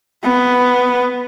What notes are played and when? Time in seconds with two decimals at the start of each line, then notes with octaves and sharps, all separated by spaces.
0.23 B3